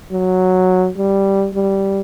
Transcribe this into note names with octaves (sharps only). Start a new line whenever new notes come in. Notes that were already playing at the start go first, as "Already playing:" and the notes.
F#3
G3
G3